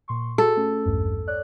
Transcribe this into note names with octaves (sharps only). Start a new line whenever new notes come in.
A#2 C6 C#6
F#4 G#4 A4
A3 C#4
A#1 E2 G2
C#5 D5 F#6